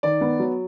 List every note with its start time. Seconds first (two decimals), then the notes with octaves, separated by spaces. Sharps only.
0.03 D#3 D5
0.21 B3
0.40 F#3